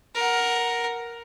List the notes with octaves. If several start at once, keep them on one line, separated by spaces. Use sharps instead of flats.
A#4 F#5